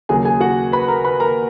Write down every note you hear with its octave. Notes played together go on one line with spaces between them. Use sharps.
D#2 C#3 F#3 G#4 G#5
G#4 G#5
F#4 F#5
B4 B5
A#4 A#5
B4 B5
A#4 A#5